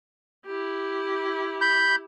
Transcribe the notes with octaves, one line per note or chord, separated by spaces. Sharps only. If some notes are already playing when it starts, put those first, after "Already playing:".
E4 G4
B5 G6